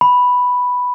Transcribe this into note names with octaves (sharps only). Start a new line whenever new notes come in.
B5